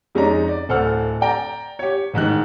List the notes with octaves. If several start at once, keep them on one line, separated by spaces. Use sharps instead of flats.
F2 G#3 C#4 D#4 D5 A#5
D5
D1 A4 C5 F#5 F6
D5 G5 A#5
G4 C#5
A1 G#2 D#3 F#6